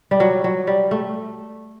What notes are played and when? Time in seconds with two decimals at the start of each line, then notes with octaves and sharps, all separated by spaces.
0.11 G3
0.20 F#3
0.44 F#3
0.67 G3
0.91 A3